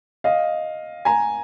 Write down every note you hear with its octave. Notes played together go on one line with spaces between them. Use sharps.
D#5 F5
G#5 A#5